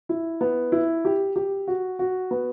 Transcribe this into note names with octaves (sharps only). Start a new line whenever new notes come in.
E4
B3
E4
G4
G4
F#4
F#4
B3